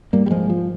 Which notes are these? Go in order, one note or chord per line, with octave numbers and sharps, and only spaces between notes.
G#2 G3 A#3
G3
F3 G#3
F3